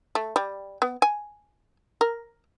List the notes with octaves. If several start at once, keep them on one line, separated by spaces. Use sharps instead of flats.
A3
G3
B3
G#5
A#4